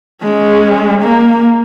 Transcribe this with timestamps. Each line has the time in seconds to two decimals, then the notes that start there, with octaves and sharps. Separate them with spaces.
0.22 G#3 C#4
1.01 A#3